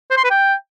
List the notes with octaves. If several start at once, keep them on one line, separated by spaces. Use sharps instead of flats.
C5
C6
B4
G5